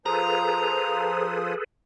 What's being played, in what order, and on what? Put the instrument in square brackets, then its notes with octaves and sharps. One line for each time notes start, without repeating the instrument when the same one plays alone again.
[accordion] F3 C5 D#6 [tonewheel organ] G#4 A4 B4 [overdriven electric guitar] A#5